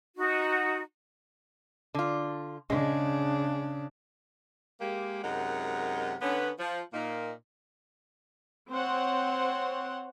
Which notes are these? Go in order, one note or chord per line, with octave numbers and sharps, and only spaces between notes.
D#4 F#4
D3 F4
C#3 G#3 D4
G#3 A#3 G4
F#2 C3 G#3 D#4 A#4 F#5
D3 B3 C#4
F3
A#2 A#3 D#4
C4 C5 C#5 F#5